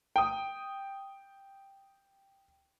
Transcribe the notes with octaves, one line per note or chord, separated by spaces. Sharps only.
G5 D#6